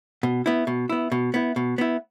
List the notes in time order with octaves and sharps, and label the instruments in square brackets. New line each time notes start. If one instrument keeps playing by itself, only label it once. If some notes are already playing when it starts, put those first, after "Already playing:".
[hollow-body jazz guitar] B2
B3 E4
B2
B3 E4
B2
B3 E4
B2
B3 E4